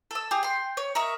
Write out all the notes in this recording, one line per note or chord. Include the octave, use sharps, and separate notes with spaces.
A4 E6
G4 G#4
G5 C6
C#5
A#4 D#5 E5 C#6